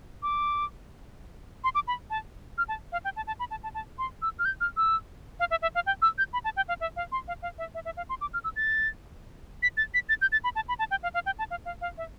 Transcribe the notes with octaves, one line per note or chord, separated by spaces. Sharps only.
D6
C6
D6
B5
A5
F6
A5
F5
G5
A5
A5
B5
A5
A5
A5
C6
E6
F6
G6
F6
E6
F5
E5
E5
F5
G5
E6
G6
B5
A5
G5
F5
E5
F5
C6
F5
F5
E5
E5
E5
F5
C6
D6
F6
E6
A6
B6
A6
B6
A6
G6
A6
B5
A5
B5
A5
G5
F5
F5
G5
A5
F5
F5
F5
E5